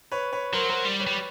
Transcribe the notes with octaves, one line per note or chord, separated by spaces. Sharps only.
B4 C#5
B4 C#5
F#3 A#4 C5
A#4 C5
G3
B4 C#5
G3